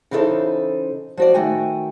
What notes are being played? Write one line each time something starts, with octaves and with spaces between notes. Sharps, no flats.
C#3 E3 D#4 E4 A4 C5
F3 F#4 D5
D#3 A3 F#4 G5 G#5